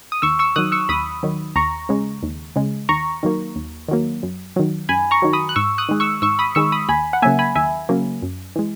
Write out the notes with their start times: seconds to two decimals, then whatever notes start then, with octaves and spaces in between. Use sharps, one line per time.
0.12 D#6
0.22 D#2 C#6 E6
0.39 C#6 E6
0.56 D#3 F#3 D#6 F#6
0.72 C#6 E6
0.89 D#2 B5 D#6
1.23 D#3 F#3
1.56 D#2 A#5 C#6
1.89 C#3 G#3
2.23 D#2
2.56 C#3 G#3
2.89 D#2 A#5 C#6
3.23 D#3 F#3 A#3
3.56 D#2
3.88 D#3 F#3 A#3
4.23 F#2
4.56 D#3 F#3
4.89 F#2 G#5 B5
5.11 A#5 C#6
5.22 D#3 F#3
5.33 B5 D#6
5.49 F#6
5.56 G#2 C#6 E6
5.78 D#6 F#6
5.89 D#3 G#3
6.00 C#6 E6
6.22 G#2 C#6 E6
6.39 B5 D#6
6.55 D#3 G#3 C#6 E6
6.72 B5 D#6
6.89 D#2 G#5 B5
7.13 F#5
7.22 C#3 F#3 A#3 E5 G#5
7.39 G#5 B5
7.55 D#2 E5 G#5
7.89 C#3 F#3 A#3
8.22 F#2
8.56 E3 G#3